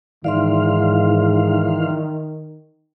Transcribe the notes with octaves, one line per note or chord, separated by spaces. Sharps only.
G#2 D#3 E3 D5 E5 F5 C6